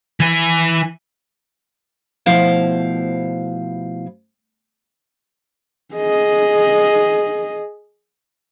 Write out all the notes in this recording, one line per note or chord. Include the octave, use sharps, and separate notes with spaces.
E3 G#5
B2 F3 A3 E4 C5 F5
G#4 D#5